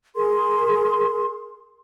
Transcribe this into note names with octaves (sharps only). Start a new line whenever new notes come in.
G#4 A#4 C6